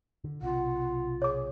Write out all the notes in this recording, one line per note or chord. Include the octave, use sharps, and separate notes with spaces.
D3
B1 C3 F4 F#5
G#4 C#5 D6